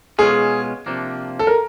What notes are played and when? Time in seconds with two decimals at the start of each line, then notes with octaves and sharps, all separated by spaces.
0.18 B2 G#3 C#4 F4 G#4
0.86 C3 F3 A#3 D4
1.39 A4
1.47 A#4